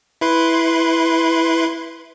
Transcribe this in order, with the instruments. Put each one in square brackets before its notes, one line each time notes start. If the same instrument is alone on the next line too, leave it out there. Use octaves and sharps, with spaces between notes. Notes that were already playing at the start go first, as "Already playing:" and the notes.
[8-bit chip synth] E4 B4 C6